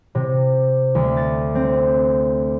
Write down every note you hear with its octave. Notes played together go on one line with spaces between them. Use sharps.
C3
D2
A6
C4